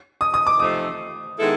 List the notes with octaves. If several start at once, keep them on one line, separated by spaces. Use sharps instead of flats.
D#6
D#6
D6
C3 F3 A3 C4 D#4 D#6
D#3 G#3 B3 E4 A4